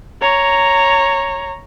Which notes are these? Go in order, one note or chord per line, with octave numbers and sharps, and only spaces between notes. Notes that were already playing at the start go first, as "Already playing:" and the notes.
C#5 A#5